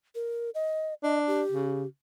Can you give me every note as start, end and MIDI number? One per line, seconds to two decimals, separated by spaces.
0.15 0.50 70
0.55 0.94 75
1.03 1.43 62
1.03 1.20 75
1.27 1.87 67
1.52 1.84 49